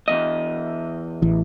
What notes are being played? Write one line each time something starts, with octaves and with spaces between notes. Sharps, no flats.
E2 G2 D#5
A1 E3